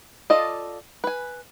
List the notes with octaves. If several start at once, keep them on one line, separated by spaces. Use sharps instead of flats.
F4 A4 D5 D#5
B4 G#5